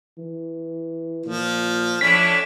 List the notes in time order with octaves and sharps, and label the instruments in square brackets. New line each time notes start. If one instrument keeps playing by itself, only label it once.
[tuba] E3
[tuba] A#2 [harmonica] F3
[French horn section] A2 D4 [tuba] F3 [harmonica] C#4 [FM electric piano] B6